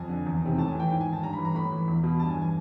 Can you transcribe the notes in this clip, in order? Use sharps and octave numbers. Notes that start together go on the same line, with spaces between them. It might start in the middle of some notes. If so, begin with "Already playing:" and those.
Already playing: F2 G#5
D3
E2
C3 D#3
A2 A5
G#5
E3 G5
G#2 G5
G#5
D#3
A5
G2 A#5
B5
E3
A#5
A2 B5
E3
E2
B2
G2 A5
G#5
E3
G#5